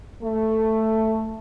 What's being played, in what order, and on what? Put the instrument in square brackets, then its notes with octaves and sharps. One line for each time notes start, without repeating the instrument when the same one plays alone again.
[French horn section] A3